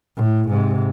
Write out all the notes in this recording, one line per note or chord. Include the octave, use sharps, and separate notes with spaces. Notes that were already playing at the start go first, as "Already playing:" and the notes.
A2
G#2 C3